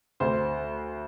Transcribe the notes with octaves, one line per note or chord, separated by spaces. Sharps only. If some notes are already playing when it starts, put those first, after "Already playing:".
D2 C5